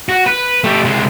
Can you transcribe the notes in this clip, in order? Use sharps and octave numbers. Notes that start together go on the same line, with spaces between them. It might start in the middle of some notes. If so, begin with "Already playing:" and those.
F#4
B4
A3 G4
C2 G#3